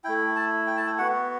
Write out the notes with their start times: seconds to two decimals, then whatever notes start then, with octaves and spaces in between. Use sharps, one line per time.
0.04 A3 E4 G5
0.36 A5
0.67 G5
0.77 A5
0.86 G5
0.98 B3 F#4 F#5